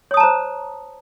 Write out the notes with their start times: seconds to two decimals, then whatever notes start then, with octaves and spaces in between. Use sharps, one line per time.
0.11 C#5
0.14 D#6
0.17 A5
0.20 A#5
0.23 C5